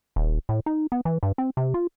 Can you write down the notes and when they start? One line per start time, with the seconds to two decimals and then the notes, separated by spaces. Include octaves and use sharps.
0.16 D#1
0.49 A2
0.66 D#4
0.92 B3
1.05 E3
1.23 G2
1.38 C4
1.57 C3
1.74 F4